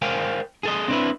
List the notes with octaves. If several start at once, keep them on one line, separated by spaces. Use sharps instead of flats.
A#4 C5 F5 G5 G#5
G#4 A4 D#5
C4 D4 E4 B4